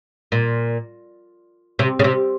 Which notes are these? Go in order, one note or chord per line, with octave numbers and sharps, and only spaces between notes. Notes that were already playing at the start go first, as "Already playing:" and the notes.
A#2
C3
C#3
C3